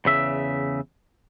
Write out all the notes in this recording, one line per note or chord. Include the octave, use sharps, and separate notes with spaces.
E2 C#3 E5